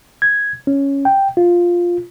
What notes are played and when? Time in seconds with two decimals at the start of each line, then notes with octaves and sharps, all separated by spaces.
0.22 G#6
0.67 C#4
1.05 G5
1.37 F4